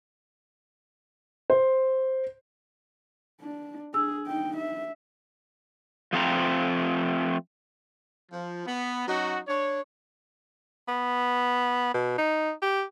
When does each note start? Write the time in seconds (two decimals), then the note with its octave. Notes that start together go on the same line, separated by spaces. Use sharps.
1.50 C5
3.41 D4
3.94 D4 G#4 E6
4.27 D#4 G5
4.57 E5
6.13 F3 A3 C4 A5 A#5
8.32 F3
8.66 B3
9.07 F#3 C#4 D#4 F#4
9.48 D4 C#5
10.88 B3
11.94 B2
12.18 D#4
12.62 G4